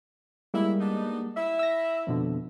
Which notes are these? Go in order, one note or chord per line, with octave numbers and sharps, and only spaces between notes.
G3 G#3 A#3 E4
B3 D4 D#4
E4 E5
E6 A#6
F2 B2 D3